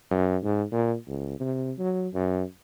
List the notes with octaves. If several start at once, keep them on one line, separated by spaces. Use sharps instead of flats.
F#2
G#2
A#2
C#2
C3
F#3
F#2